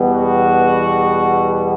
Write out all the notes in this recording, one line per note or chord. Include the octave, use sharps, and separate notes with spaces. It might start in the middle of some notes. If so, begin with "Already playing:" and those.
Already playing: E2 B2 G3 B3
F#4